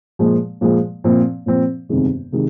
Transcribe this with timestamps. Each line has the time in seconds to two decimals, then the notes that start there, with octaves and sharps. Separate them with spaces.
0.19 A#2 F3 G#3
0.61 A#2 F3 G#3
1.04 A#2 F3 C4
1.46 A#2 F3 C4
1.89 G1 F2 C3 D#3 G#3
2.32 C3 D#3 G#3